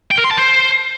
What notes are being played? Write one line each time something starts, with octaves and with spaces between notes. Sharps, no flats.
G5
A#4
C6
A5
C5